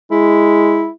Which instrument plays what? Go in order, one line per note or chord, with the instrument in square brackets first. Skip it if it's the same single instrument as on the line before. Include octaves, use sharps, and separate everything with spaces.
[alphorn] G#3 [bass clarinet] E4